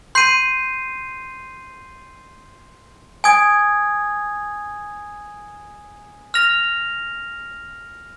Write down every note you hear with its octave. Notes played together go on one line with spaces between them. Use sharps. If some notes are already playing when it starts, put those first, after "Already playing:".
C6 G6 C7 D#7
G#5 D#6 G#6
F6 A#6 F7